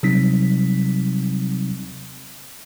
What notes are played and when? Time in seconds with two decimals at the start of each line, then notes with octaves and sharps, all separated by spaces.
0.03 C3 F#3 G3 C4 D#4 B6